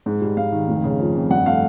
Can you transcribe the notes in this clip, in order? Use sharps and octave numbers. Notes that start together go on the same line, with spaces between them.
G#2
G3
G#2 F5
D#3
F1
C#3
F3
F2
G2 F#5
A3 F5